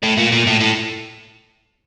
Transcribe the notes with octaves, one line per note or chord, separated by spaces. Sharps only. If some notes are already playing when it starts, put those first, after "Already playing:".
A2
A#2
A#2
A2
A2